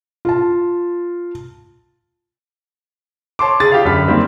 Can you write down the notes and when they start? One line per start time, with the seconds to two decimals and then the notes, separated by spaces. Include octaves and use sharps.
0.25 F4 A5
3.39 C#5 A5 C6 D6
3.60 C#3 G#4 A6
3.72 F4 G4 F5
3.85 F#2 D3 B5 B6
4.08 D#3 G3 A#3 C4